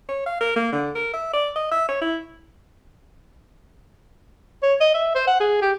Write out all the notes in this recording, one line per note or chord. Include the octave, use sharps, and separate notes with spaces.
C#5
F5
A#4
A#3
D3
A#4
E5
D5
D#5
E5
C#5
E4
C#5
D#5
E5
C5
F#5
G#4
G4